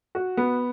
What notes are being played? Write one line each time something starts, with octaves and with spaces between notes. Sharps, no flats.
F#4
B3